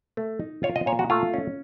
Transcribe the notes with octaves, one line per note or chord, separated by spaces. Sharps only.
A3
D#4
F4 C#5
D#5
A#2 C#5
F#4
A3 F4
C#4